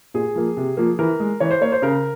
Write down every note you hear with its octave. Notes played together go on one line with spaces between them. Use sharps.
A#2 G#4
F3 A#3
C3
F3 A#3
E3 A#4
G#3
E3 C#5
C5
A#3 C#5
C5
C#3 A#4